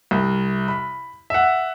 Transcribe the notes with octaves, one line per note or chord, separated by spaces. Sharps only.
C2
B5
E5 F#5